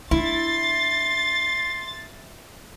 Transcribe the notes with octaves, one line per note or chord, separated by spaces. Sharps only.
D4 E4 C6 A6